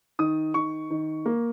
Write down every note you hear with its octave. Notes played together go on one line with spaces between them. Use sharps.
D#3 D#6
D#3 C#6
D#3
A#3